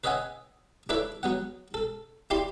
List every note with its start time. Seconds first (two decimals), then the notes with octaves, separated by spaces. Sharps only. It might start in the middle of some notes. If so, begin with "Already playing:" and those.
0.04 B4 C#5 D#5 E5 F#5 G#5
0.89 D4 E4 A4 B4 C#5 E5
1.23 F#3 B3 F#5
1.74 A4
2.30 E4 G4 D5 B5 C6